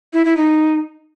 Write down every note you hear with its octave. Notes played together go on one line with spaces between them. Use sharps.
E4
E4
D#4